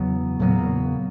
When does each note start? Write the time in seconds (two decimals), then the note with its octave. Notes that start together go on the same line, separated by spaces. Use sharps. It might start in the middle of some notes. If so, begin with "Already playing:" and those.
Already playing: E2 C#3 F#3 B3
0.39 E2 A#2 C#3 F#3 A#3 B3